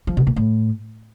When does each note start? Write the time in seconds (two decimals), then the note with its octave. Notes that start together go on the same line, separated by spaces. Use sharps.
0.07 F3
0.17 B2
0.27 A#2
0.36 A2